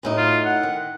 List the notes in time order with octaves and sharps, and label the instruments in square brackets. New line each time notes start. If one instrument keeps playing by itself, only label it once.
[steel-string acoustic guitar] F#2 A2 D#4
[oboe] F4
F#5
[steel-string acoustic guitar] D#3